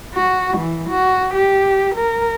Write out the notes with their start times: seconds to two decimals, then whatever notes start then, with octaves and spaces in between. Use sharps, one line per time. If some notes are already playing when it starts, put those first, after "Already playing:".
0.15 F#4
0.58 E3
0.89 F#4
1.34 G4
1.95 A#4